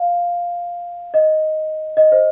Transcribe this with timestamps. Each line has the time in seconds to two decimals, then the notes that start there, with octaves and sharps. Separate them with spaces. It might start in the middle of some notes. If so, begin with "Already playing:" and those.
Already playing: F5
1.14 D#5
1.97 D#5
2.12 C5